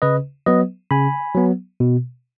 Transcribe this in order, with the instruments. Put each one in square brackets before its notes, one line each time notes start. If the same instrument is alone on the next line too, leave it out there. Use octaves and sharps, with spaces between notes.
[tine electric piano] C#3 B4 D#5
F#3 B3 B4 D#5
C#3 G#5 B5
F#3 B3
B2